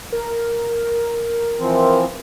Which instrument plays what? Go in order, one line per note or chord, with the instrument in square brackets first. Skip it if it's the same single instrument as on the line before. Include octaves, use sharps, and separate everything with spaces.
[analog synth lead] A#4
[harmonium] E3 F3 C4